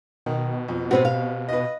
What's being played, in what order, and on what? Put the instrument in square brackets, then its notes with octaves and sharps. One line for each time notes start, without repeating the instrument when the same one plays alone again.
[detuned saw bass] B2 [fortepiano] D#3
[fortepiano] F2
[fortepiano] C3 B4 C5 [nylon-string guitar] B3 C4 F#4
[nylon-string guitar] F5
[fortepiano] B4 D#5